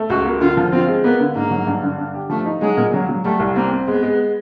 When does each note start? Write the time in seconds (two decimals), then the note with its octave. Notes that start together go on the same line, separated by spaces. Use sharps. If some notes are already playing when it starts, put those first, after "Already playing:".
Already playing: A3
0.10 C#2 F#4
0.26 A#3
0.41 D3 F4
0.57 F3
0.72 C4 F4
0.88 G#3
1.04 A#3 B3
1.20 D3
1.35 G#2 A#3
1.51 F#3
1.67 G2
1.83 D3
1.98 D4
2.14 G4
2.30 F3 A3
2.46 D#4
2.62 F#3 G#3
2.77 A#2
2.94 F#3
3.09 F#3
3.25 G3 A3
3.40 C2
3.56 A#3 C4
3.72 C4
3.88 G#3 B3
4.03 G#3